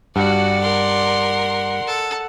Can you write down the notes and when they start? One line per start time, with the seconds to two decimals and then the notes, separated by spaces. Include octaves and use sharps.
0.16 G2 F#4 D5 F#5
0.61 A#4 C6
1.87 A4